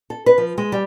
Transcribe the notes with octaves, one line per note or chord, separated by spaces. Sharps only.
A4
B4
F3
G#3
G3